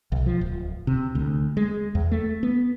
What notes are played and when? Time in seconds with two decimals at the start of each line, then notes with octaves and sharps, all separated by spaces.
0.12 B1
0.26 F3
0.41 D1
0.87 C3
1.15 D2
1.57 G#3
1.95 E2
2.12 A3
2.43 B3